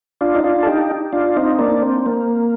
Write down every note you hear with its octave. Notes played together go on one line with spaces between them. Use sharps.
D4 F4
D#4
D4 F4
A4
D#4 G4
D4 F4
C4 D#4
A#3 D4
C4
A#3